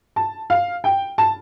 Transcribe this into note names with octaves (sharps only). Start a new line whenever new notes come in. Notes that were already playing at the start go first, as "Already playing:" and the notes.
A5
F5
G5
A5